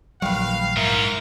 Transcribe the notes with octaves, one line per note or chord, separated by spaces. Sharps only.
A#1 D#3 F#3 G3 B4 F5
G#2 E4 A#4